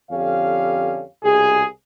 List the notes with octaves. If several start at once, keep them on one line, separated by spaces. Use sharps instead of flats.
F2 D3 C#4 G4 F5
C2 B2 G#4